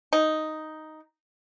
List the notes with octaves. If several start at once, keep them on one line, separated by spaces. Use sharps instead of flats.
D#4